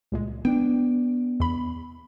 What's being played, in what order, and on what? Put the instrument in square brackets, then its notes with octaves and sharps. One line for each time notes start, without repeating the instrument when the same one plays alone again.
[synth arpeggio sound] C#2 A#2 G#3
[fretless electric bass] B3 D4 [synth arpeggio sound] G5
[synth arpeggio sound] E2 B5